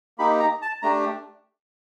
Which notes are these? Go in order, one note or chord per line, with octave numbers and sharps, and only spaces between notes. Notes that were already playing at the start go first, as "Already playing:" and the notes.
A#3 D#4 G4 B5
A#5
A5
A3 D4 G4 A#5